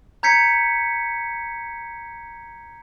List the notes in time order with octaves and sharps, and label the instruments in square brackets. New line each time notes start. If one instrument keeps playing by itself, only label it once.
[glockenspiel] A#5 G6 G#6 B6 C#7